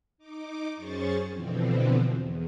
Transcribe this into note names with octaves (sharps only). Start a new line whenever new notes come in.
D#4 D6
F#2 C#4 G#4 C5 C#6 A6
B2 D3 E3 F3 C4
E2